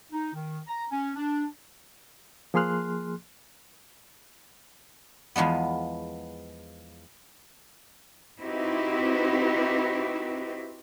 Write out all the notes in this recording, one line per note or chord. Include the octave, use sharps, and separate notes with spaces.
D#4
D#3
A#5
C#4
D4
F3 A#3 G#4 C6 F6 F#6
E2 F3 G#3 B3
C4 D#4 E4 F#4 G4 B4